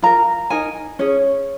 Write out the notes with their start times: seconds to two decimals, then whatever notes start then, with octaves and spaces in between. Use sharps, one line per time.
0.02 F4 A#4 A#5
0.50 D#4 A#4 G#5
0.99 C#4 G#4 C#5